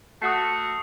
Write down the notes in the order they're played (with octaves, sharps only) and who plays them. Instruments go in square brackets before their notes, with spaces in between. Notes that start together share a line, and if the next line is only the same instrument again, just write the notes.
[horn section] A3 F#4 [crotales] D#6 C7